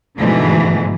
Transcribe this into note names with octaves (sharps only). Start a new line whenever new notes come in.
G#2 B2 D3 E3 F3 A3